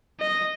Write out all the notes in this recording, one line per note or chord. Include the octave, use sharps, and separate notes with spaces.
D#5